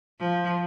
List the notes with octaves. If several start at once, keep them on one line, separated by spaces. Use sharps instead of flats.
F3